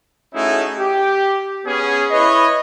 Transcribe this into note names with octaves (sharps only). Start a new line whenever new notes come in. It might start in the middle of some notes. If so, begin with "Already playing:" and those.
A3 C#4 D#4 E4 F#4 G#4
G4
B3 C#4 G#4
E4 B4 C#5 D#5